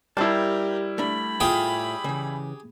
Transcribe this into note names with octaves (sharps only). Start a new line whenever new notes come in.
G3 E4 G4 A#4 C5 A5
A3 D4 B5
A2 F4 G4 G#4 F5 G5
C#3 E3